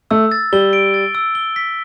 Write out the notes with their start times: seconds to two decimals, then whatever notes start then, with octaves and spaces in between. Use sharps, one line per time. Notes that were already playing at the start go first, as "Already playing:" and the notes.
0.11 A3 E6
0.32 A6
0.53 G3 G7
0.73 D7
0.94 A6
1.15 E6
1.35 G7
1.56 B6